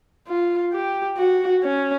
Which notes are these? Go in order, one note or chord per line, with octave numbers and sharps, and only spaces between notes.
F4
G4
F#4
C#4